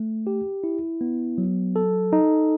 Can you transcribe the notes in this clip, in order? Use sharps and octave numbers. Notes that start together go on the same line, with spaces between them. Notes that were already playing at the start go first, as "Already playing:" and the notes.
Already playing: A3
G4
E4
B3
F#3
A4
D#4